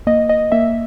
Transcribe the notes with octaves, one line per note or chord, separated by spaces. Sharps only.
A#3 D#5
D#5
A#3 E5